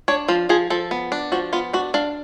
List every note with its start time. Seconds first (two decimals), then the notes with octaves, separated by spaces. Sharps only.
0.08 D4 C#5
0.28 F3 F4
0.49 F3 G#4
0.70 F3 A4
0.91 B3
1.12 D4
1.32 F3 F#4
1.53 B3 F4
1.73 D4 F#4
1.94 D4 F5